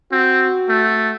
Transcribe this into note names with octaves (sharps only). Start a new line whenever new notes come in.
C4 F#4
A3